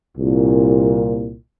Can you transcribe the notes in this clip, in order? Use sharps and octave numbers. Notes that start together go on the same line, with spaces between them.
C2 A#2